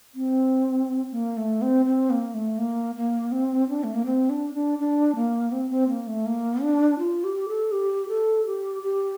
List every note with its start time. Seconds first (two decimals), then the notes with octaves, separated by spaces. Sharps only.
0.15 C4
1.11 A#3
1.37 A3
1.62 C4
1.85 C4
2.10 A#3
2.34 A3
2.58 A#3
2.96 A#3
3.32 C4
3.69 D4
3.84 A3
3.94 A#3
4.06 C4
4.29 D4
4.54 D4
4.79 D4
5.15 A#3
5.52 C4
5.70 C4
5.88 A#3
6.07 A3
6.26 A#3
6.62 D4
6.99 F4
7.24 G4
7.48 A4
7.72 G4
8.09 A4
8.46 G4
8.83 G4